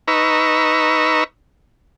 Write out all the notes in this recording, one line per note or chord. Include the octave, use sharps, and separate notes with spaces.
D#4 B4 A#5 C#6 E6